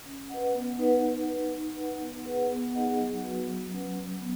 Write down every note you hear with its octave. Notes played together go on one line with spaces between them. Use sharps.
C#4
B4 D#5 F#5
B3
D#4 B4 D#5 F#5
D#4
B4 F#5
D#4
B4 F#5
B3
G#4 B4 F#5
B3
D#4 G#4 D#5 F#5
F#3
B3 F#4 B4
F#3
C#4 B4 F#5
F#3
B3